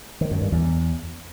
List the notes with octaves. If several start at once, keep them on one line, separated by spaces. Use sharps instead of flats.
D#3
F#2
G2
E2